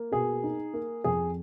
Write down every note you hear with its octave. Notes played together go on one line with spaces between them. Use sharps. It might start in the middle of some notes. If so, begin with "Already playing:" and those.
Already playing: A#3
B2 G#4
D#4
A#3
F2 G#4